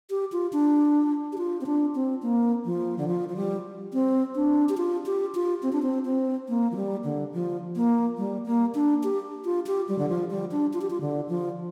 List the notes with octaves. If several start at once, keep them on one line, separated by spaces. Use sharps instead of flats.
G4
F4
D4
G4
F4
C4
D4
C4
A#3
F3
D3
F3
F3
G3
C4
D4
G4
F4
G4
F4
C4
D4
C4
C4
A#3
F3
G3
D3
F3
A#3
G3
A#3
D4
G4
F4
G4
G3
D3
F3
G3
D4
F4
G4
F4
D3
F3